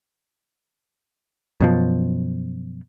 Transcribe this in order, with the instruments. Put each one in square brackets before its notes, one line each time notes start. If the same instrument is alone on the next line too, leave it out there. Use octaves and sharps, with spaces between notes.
[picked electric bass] F#2 B2 F3